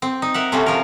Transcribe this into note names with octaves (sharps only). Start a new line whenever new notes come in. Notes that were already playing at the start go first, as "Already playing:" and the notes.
C4
D#4
A#4 E5 F#5
C3 A3 C4 C#4 F#4
F3 A#4